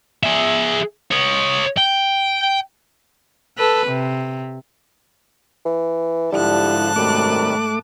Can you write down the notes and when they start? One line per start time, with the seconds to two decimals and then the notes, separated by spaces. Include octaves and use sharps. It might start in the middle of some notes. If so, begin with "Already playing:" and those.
0.23 G#4 E5
1.11 C#5 D#5
1.78 G5
3.58 A4 B4
3.87 C3
5.66 E3
6.33 G#2 D3 F3 G3 E4 A5 F#6
6.96 F#2 C3 D#3 G3 A3 D6